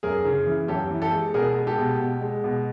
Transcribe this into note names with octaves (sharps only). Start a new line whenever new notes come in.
F#2 G#4 A#4
C#3
E3
F#2 G4 A4
E3
G4 A4
G#3
B2 G#4 A#4
G#3
G4 A4
B2
B2
G#3
B2